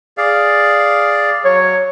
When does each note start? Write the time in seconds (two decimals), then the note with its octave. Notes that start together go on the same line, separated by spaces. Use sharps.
0.18 G#4 D5 F5
1.45 F#3 C#5